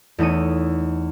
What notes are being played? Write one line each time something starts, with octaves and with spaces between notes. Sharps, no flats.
E2 A3 D#4 C#5 D#7